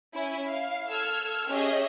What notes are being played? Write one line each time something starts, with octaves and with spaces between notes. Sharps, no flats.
C#4 E4 G#5
F5
A4 E6 F6 G#6
C#4 G4 G#4 D#5 E5